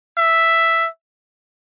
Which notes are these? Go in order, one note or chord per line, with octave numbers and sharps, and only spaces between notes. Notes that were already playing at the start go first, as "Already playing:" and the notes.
E5